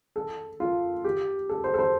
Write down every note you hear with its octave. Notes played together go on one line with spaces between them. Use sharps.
A4
F4
G4
A4
C5
A4
C5